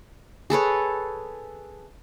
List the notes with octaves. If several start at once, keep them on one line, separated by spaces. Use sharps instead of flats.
G#4 A4 B4 C#5